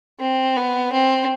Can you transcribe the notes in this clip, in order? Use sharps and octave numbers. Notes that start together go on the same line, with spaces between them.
C4
B3
C4